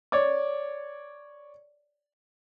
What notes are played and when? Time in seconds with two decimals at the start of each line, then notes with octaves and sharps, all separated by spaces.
0.12 C#5 D5 D6